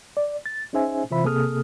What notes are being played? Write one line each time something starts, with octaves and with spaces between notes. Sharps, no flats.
D5
A6
C#4 D#4 G#4 C5 E5 G#5
C3 E3 F4 C5 E5 B5
C3 A#3 G#4 A4 D#6 F6